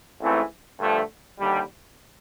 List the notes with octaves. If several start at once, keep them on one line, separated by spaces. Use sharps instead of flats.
A1 G#2 E3 A3 C4
G2 D3 F3 A3
D#2 D3 G3